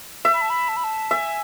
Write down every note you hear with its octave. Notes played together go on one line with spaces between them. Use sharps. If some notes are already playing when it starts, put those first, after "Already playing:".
E5
B5
A5
B5
A5
B5
A5
E5 G#5